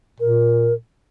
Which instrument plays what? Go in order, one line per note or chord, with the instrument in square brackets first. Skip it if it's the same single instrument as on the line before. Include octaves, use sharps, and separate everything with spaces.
[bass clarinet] A#2 [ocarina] A#4